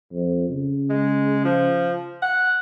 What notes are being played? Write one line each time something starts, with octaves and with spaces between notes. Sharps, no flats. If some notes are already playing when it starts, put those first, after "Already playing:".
F2
C#3
G#3
F3
F#5